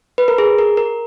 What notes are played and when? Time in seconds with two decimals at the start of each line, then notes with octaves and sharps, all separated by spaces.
0.18 B4
0.28 A#4
0.38 G#4
0.58 A#4
0.77 A#4